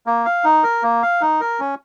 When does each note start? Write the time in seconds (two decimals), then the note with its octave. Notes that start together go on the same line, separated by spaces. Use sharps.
0.06 A#3
0.25 F5
0.44 D#4
0.64 A#4
0.83 A#3
1.02 F5
1.21 D#4
1.41 A#4
1.60 C#4